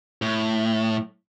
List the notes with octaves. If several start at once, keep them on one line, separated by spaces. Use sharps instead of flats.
A2